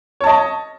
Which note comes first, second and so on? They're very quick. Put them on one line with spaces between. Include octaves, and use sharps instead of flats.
C#5 A5 D#5